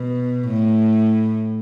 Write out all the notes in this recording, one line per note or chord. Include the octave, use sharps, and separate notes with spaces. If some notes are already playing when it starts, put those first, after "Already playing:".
Already playing: B2
A2